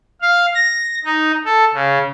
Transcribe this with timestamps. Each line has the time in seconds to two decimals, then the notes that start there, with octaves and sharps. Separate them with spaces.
0.22 F5
0.55 A#6
1.04 D#4
1.45 A4
1.74 C#3